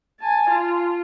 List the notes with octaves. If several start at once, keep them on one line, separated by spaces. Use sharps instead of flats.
G#5 A5
F4